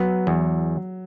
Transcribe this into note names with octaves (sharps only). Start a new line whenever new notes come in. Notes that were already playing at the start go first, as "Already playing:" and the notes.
Already playing: F#3 B3
E2